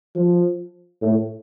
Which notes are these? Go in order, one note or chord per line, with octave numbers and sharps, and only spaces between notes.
F3
A2